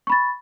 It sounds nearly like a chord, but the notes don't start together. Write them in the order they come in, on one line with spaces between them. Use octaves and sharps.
C#6 B5 A6